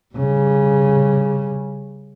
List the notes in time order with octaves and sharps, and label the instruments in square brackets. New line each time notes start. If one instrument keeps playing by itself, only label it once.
[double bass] C#3 G3